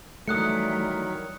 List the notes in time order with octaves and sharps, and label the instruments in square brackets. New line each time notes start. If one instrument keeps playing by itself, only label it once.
[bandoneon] D#3 F#3 [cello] E3 G3 [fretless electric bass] A3 [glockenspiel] D#6 F#6 C#7